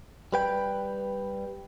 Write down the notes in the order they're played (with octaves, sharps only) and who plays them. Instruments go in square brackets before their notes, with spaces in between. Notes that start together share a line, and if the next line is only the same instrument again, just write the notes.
[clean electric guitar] G3 B4 G5